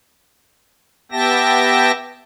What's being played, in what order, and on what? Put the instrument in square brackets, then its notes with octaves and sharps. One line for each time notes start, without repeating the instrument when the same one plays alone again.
[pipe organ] B3 G4 E5 G5 A5 A#6